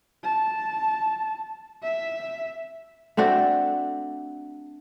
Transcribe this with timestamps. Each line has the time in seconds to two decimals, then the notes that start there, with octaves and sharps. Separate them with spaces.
0.24 A5
1.83 E5
3.17 A3 C4 D4 F#4